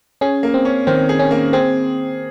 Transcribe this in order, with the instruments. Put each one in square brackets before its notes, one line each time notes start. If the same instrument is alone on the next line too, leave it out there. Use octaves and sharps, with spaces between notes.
[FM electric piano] C#4 [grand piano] G#4
[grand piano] A#3
[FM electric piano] C4
[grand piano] C#4
[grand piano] D#3 [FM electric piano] C4
[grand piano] G#4
[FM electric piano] C#4
[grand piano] A#3
[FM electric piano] C4 [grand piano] G#4